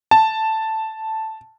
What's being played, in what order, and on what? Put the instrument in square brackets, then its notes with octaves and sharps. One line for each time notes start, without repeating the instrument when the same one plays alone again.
[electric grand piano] A5